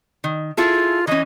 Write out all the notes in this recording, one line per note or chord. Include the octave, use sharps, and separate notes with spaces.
D#3
E4 F4 G#4 A4
E3 C#4 D#5